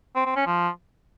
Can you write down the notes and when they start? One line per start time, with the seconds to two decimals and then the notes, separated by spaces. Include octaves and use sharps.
0.16 C4
0.26 C4
0.36 C#4
0.46 F3